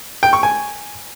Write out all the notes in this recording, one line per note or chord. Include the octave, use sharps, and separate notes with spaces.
G5
C#6
G#5